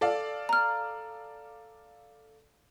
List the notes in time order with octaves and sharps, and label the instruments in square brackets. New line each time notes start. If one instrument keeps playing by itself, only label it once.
[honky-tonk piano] A4 D5 F5
[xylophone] A#5 F6